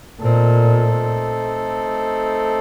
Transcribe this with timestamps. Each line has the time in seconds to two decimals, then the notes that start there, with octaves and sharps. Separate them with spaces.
0.20 A#2 A3 C4 D#4 A4